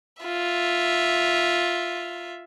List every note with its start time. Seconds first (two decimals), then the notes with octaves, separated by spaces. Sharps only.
0.23 F4 E5